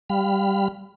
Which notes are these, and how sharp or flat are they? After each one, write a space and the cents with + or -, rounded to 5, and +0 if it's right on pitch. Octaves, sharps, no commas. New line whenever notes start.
G3 +0 F5 +0 B5 +25